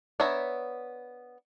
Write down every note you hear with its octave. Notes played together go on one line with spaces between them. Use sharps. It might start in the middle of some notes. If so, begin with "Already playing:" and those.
B3 D4 C#5 E5 A#5